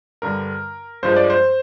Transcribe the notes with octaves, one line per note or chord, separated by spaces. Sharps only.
G2 D3 G3 A#4
G2 F3 G#3 C5
D5
C5